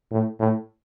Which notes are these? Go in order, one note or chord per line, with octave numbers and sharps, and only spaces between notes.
A2
A2